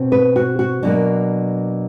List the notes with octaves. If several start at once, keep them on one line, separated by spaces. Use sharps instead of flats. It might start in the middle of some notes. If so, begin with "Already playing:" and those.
Already playing: B2 C4
B4
F#4
F#4
B2 F#3 A#3 D4